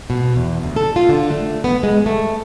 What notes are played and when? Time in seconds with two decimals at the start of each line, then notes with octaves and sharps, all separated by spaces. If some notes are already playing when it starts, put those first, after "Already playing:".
0.10 B2
0.36 E2
0.63 D2
0.76 A4
0.96 F4
1.09 D3
1.30 A3
1.64 B3
1.83 G#3
2.06 A3